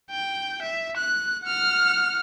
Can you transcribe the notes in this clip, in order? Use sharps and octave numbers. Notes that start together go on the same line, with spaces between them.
G5
E5
F#6
F#5 F6